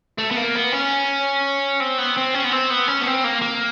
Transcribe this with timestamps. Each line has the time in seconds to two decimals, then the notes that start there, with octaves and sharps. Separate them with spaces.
0.18 A3
0.31 B3
0.37 A#3
0.55 B3
0.72 C#4
1.80 C4
1.98 B3
2.17 C4
2.34 C#4
2.44 B3
2.52 C4
2.70 B3
2.87 C#4
3.01 B3
3.06 C4
3.24 A#3
3.42 A#3